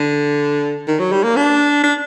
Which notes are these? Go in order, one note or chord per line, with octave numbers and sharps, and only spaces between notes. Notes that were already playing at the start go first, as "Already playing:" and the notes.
Already playing: D3
D#3
F#3
G3
A#3
D4
D4